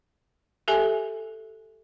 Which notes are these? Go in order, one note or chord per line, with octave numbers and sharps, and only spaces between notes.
G4 A4 E5 G#5